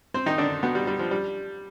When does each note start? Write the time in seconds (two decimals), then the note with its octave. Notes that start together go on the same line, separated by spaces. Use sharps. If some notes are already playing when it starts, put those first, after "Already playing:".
0.14 C4 C5
0.26 D#3 D#4
0.38 D3 D4
0.63 B2 B3
0.75 G3
0.87 G3
0.99 F3
1.11 G3